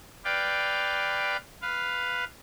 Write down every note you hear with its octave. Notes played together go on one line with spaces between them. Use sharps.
B4 D5 F5 G5
B4 F5